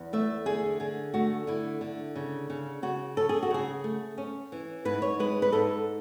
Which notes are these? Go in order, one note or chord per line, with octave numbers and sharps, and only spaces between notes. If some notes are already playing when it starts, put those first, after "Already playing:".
Already playing: E2
A3 E5
D3 G#4
D3 G#4
A3 F#4
D3 E4
D3
C#3
C#3
C#3 F#4
C#4 A4
G#4
F#4
C#3 G#4
A3
C#4
E3
G#2 B4
C#5
G#3 B4
B4
G#2 A4